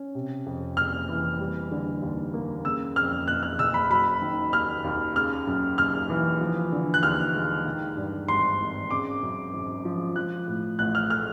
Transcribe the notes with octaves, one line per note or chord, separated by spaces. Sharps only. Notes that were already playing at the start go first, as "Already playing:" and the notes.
Already playing: C#4
C3
F2
F#1 F6
E3
G3
D3
D#2
A#3
C#3 E6
F2 F6
F#1 F#6
F6
F#1 E6
B5
F#3 B5
D#3
D#2 F6
D#2
C#3 F6
F#2
F#1 F6
E3
F3
D3
F#6
D#2 F6
G#3
D#3
G2
G#1 C6
G#1
C#3 D6
F#2
G#1
F3
F3 F#6
A2
A1 F#6
F6
A3 F6